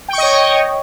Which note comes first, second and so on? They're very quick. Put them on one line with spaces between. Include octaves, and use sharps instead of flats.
G5 C#6 D#5 C#5